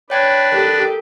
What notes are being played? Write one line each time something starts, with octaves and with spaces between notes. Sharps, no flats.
D4 B4 C#5 D5 G5 G#6
G4 A4 A#4